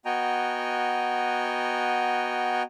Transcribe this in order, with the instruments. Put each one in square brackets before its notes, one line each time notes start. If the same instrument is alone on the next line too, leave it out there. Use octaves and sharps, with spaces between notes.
[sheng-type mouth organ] B3 F#4 D#5 G5 G#5 A#5